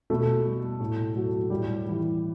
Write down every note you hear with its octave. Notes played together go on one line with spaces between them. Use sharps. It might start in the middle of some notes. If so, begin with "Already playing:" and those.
B2 A3 A4
G3
A2
F#3 A3
A2 G3 G4
E3 G3